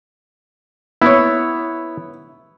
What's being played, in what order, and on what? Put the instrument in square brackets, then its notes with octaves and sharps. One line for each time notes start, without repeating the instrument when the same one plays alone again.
[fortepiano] B3 C#5 [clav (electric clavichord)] E4